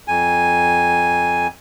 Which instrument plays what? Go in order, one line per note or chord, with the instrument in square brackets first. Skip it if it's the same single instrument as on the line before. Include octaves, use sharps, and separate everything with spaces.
[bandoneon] F2 G#5